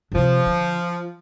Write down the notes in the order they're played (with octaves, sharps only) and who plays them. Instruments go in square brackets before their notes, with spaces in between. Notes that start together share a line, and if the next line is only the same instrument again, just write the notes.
[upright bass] D3
[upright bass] C3 [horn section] F3
[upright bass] D3